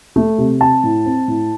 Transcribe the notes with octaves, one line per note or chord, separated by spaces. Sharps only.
A3
C3
C4 A5
A2
C4
A2